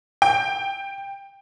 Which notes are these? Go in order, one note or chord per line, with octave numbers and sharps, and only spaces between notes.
G5